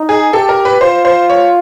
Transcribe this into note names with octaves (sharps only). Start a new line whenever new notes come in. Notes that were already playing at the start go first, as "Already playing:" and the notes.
Already playing: D#4
G#4
G4 A4
A#4
B4
F4 C5
C5
C#5